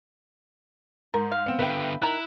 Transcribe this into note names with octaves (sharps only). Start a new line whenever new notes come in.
G#2 A#4
F5
B3 C4
D3 B3 B4 E5 G5
D#3 E4 A#5 F#6